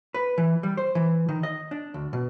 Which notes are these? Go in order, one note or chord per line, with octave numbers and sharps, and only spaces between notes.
B4
E3
G3
C5
E3
D#3
D#5
D4
D2
B2